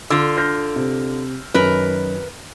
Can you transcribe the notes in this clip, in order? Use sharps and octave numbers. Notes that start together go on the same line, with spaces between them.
D3 D4 F4 E6
F6 G6 A#6
C3
F#2 D#3 A#4 B4